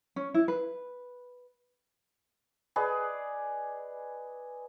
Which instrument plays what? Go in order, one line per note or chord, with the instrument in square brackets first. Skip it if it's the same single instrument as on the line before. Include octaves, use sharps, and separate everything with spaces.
[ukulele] C#4
E4
B4
[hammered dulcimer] G#4 B4 D5 D#5